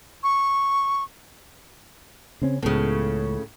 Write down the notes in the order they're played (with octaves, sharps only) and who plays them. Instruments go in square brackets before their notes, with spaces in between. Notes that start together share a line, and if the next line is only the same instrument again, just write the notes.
[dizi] C#6
[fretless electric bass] C#3 C4 C#4
[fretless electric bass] C#2 B3 [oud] A2 C#3